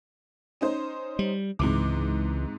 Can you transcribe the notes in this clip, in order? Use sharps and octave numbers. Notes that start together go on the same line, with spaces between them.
C#4 D#4 C5
G3
C#2 G#2 C3 E3 D6